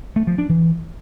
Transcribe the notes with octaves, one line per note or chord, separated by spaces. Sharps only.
A3
F3
D4
E3